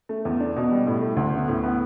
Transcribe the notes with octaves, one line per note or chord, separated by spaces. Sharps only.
A3
E2
D4
B2
G3
A2
A3
D2
B3
A2
B3